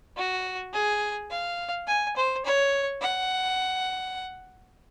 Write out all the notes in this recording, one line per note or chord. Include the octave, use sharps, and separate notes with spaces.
F#4
G#4
F5
G#5
C5
C#5
F#5